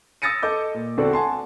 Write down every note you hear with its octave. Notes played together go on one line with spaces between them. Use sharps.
D#6 E6 A6 A#6 C#7 D#7
A4 D#5 D6 G6
A#2
E2 D3 C4 F#4 A4 D5
F#5 G#5 A5 C6